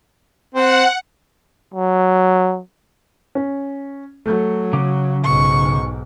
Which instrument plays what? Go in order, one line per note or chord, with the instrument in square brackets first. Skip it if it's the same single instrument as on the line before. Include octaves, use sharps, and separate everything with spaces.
[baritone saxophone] C4 [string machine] F#5
[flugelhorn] F#3
[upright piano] C#4
[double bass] F#3 [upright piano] A3
[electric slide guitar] C#3 [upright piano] D6
[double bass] B1 G#2 [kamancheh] C#6